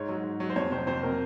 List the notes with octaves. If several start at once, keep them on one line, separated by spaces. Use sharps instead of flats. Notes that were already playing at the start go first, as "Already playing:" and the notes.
Already playing: G#2 C#5
F#3
G#2
F#3
C5
F2 C#5
C3 F#3 C5
F2 C5
C3 F#3 A#4